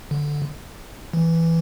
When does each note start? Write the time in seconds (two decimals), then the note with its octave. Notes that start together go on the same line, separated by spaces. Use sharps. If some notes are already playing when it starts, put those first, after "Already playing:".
0.11 D3
1.13 E3